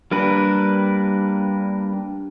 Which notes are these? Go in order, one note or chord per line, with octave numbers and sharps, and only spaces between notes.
G3 A#3 D4 A#4 B4